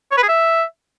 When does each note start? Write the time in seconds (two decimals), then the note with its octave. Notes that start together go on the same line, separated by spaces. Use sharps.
0.12 C#5
0.17 B4
0.23 G#4
0.29 E5